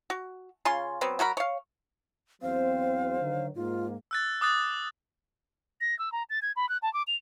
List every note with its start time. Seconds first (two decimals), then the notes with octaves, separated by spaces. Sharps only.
0.10 F#4
0.65 C#3 C#4 F4 C6
1.01 F#3 B3 C4
1.19 F#3 F#4 A#4 B5
1.37 C#5 F5
2.42 E2 F#3 C4 C5 F5
3.21 D3 D#3 F#3
3.56 G#2 A#3 F4
4.11 E6 F#6 A6
4.41 D6 D#6 F#6 A6
5.81 A#6
5.99 E6
6.12 A#5
6.30 A6
6.42 G#6
6.56 B5
6.69 F#6
6.82 A5
6.94 D6
7.07 F7